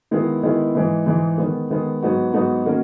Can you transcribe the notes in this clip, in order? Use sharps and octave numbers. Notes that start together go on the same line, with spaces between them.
D#3 G#3 B3 E4
D#3 G#3 B3 E4
G#2 E3 G#3
G#2 E3 G#3
D#3 G#3 B3
D#3 G#3 B3
G#2 F#3 B3 D#4 F#4
G#2 F#3 B3 D#4 F#4
D#3 A#3 C#4 F#4 A#4